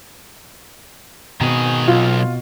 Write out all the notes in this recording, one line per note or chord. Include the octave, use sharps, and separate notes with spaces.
B2 D#3 C4 G#4
B1 F4